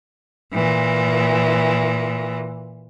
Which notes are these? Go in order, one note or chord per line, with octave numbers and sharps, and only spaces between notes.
A#2 E3